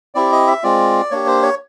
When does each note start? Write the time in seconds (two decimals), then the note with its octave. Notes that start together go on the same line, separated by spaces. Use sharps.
0.15 C4 E4 G4 D5
0.32 D#5
0.47 E5
0.63 G#3 C4 F4 D5
1.11 A#3 D4 G4 C#5
1.27 C5
1.42 C#5